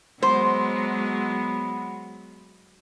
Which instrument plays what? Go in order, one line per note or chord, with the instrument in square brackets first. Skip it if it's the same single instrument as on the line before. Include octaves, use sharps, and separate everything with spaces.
[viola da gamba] F#3 G#3 [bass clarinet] B3 [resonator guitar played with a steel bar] C5